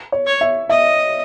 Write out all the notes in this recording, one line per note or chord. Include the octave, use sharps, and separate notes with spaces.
C#5
C#5
E5
D#5 E5